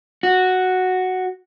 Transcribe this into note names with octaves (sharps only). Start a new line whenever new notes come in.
F#4